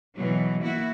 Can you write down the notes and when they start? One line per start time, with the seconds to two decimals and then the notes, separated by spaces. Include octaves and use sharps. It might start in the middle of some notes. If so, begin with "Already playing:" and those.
0.15 B2 E3 F#3
0.61 A#3 E4 F#4